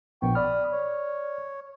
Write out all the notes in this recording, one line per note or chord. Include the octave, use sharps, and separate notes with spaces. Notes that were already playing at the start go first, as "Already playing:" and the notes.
A#1 B3 G5 C#6
D5 B5 D#6 F6
C#5